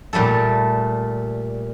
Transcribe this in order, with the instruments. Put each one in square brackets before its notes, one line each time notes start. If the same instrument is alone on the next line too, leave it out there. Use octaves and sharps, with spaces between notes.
[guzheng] A#2 G3 A3 A4